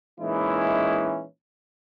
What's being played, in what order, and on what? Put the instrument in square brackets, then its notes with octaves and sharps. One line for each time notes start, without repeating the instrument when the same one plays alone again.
[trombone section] A#2 E3 G#3 C#4 D#4 E4